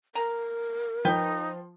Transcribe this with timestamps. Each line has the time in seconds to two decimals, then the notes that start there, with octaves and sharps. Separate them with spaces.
0.15 A#4 A#5
1.05 F3 D#4 B4 G5